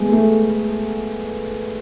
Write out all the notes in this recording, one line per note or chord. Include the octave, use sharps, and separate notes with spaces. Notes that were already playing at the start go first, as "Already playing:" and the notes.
Already playing: G#3 A3 B3
A3